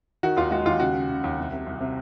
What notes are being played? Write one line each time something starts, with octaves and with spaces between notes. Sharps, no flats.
D#3 F#4
D#2 F4
G#3 F#4
D#2 F4
C#3 F#4
C#3
C#3
D#2
C2
C3
C2
C3